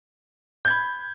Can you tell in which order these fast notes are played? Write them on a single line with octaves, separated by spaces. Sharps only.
G6 G#6 B5